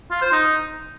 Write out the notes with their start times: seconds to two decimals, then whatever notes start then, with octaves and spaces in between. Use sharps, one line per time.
0.11 F4
0.22 C5
0.33 D#4